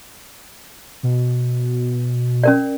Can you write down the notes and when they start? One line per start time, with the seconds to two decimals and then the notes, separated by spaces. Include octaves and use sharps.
1.03 B2
2.44 C#4 A#4 D5